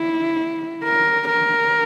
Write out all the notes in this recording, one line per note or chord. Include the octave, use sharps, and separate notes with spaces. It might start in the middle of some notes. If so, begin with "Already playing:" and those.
Already playing: E4
A#4
A#4